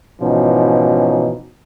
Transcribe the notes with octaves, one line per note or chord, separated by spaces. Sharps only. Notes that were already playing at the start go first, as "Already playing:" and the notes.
G#1 B2 E3 F3 C#4 D#4